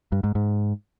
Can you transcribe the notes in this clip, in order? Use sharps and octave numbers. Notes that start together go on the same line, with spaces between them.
G2
G#2
G#2